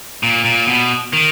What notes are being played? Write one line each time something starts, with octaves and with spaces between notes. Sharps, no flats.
A#2
A#2
B2
D#3